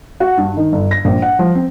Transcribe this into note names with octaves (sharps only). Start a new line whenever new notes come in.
F#4
G2
D#3
G1
A#6
A#1
F#5
F3
C4